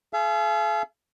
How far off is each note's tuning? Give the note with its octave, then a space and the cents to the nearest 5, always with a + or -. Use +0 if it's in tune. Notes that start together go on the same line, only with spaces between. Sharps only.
G#4 +45 F5 -40